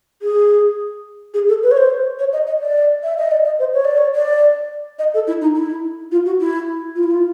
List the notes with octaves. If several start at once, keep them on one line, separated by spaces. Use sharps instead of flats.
G#4
G#4
A4
B4
C#5
C5
C#5
D#5
D#5
D5
E5
D#5
D5
D#5
C5
C#5
D5
C#5
D5
D#5
A4
E4
D#4
E4
F4
F#4
E4
F4
E4
F4